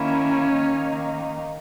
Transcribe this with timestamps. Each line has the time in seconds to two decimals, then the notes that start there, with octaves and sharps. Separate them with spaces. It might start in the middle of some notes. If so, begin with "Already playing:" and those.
Already playing: D#3 A#3 C#4 E4
0.54 D#3 A#3 D#4